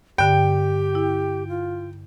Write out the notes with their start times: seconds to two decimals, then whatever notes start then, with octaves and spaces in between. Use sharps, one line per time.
0.18 G2 D3 G4 G5
0.95 E4
1.48 F4